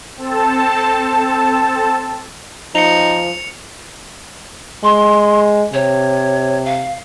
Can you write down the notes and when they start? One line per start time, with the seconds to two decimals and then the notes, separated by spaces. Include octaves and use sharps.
0.17 C4 A4 A5
2.75 F3 D#4 C#7 F7
4.84 G#3 C6
5.74 C3 C#5
6.65 F5